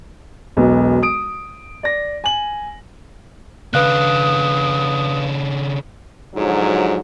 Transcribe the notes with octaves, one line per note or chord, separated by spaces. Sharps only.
E1 B1 B3
D#6 D7
D5 A#6
G#5 F#7
C#3 D4 B4 F5 D#6 F#6
G#2 D3 F3 F#3